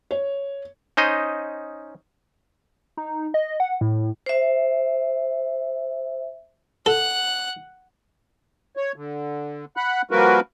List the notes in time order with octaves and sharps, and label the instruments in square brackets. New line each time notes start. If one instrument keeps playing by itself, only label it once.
[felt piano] C#5
[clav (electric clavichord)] C#4 D#4 C5 D#5
[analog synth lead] D#4
D#5
F#5
A2
[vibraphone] C5 E5
[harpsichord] A4 [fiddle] F#5 F#6
[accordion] C#5
D3
F#5 B5 F#6
F3 G3 A#3 F#4 A#4 B4